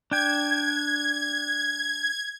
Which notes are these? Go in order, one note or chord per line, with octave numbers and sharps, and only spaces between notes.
D4 G5 G#6